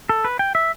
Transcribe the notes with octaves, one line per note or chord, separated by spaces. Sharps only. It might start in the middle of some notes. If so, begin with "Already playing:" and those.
A4
B4
G5
E5